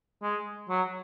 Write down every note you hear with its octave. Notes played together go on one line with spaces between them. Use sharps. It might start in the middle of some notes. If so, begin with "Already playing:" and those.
G#3
F#3